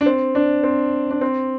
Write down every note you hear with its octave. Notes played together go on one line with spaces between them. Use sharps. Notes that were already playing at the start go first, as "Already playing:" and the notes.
D4
C4
D4
C4
D4
C4